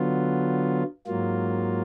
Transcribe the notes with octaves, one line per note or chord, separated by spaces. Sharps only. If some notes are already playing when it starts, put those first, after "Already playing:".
Already playing: D3 F#3 B3 F4
G#2 F#3 A#3 F4